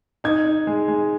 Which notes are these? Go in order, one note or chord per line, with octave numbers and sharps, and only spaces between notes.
D#4 G#6
D#4
G#3
G#3